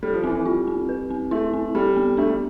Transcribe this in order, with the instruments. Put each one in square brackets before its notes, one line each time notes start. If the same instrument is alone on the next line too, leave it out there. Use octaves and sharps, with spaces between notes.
[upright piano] G3 [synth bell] A4
[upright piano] F3
[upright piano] E3 [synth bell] C4
[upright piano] E3
[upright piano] G3 [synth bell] F4
[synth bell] C4
B4
C4
[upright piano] A3 [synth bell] E4
[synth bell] C4
[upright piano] G3 [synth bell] A4
[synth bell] B3
[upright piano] A3 [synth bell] D4
[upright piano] G3